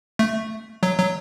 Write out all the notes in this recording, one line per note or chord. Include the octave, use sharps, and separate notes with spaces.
A3
F#3
F#3